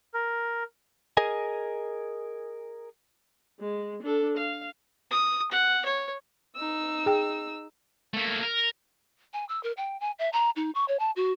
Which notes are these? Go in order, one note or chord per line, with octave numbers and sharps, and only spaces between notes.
A#4
G#4 A#4 D#5 G#5
G#3
D4 A4
F5
D#6
F#5
C#5
D#4 E6
G#4 G5
A3 A#3
A#4
G#5
E6
A#4
G5
G#5
E5
A#5
D#4
C#6
C#5
A5
F#4